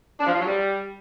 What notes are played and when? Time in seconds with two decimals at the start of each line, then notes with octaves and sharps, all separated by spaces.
0.20 D4
0.27 F3
0.33 F4
0.40 F#3
0.46 G3